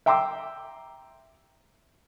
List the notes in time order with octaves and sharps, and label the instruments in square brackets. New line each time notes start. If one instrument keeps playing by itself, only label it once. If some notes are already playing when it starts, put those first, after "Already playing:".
[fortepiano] E5 G5 A#5 C6 D6 E6